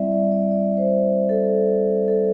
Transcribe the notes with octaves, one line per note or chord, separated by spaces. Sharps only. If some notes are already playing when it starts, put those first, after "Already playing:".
Already playing: G3 C4 E4 D5 E5
D5
D5
D5
C5
A4
A4